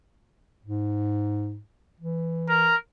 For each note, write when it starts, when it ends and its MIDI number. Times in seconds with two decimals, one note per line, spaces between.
0.65 1.60 44
2.00 2.73 52
2.49 2.76 70